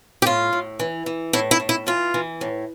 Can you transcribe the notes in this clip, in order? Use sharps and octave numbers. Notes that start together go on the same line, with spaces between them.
G4
A2 F4
A2
E3
E3
A2 E4
E4
A2
E4
E3 F4
E3
A2